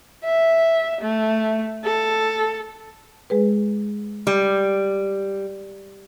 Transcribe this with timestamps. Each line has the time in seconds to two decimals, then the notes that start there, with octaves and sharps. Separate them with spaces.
0.24 E5
1.01 A3
1.85 A4
3.30 G#3 G#4 B4
4.27 G3